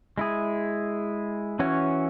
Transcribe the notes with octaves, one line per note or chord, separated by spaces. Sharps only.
G#3 E4 G#4
E3 C#4 F#4 C#5